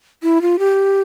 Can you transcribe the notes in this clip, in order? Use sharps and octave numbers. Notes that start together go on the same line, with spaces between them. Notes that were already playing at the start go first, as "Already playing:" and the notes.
E4
F4
G4